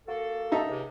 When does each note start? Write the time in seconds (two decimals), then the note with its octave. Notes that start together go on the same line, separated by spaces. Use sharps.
0.06 A#3 F#4 A4
0.52 D#4 E5 A5
0.68 C#2 C3